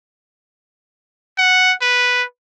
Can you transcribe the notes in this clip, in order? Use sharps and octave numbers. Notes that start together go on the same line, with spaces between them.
F#5
B4